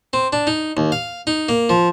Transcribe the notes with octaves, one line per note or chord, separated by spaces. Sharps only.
C4
D4
D#4
D#2
F5
D#4
A#3
F3